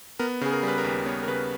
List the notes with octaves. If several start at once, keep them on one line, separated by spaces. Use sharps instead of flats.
B3 A#4
C#3 G#4
A#4
G3
B4
A#4
D#2 B4
B3 C#5
A#4
C#3 B4